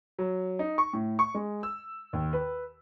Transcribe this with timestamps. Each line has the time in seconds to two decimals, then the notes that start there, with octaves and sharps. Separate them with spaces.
0.19 F#3
0.59 D#4
0.78 C#6
0.93 A2
1.19 C#6
1.35 G#3
1.63 E6
2.13 D#2
2.33 B4